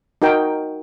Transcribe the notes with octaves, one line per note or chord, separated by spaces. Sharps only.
D#4 F#4 A#4 G5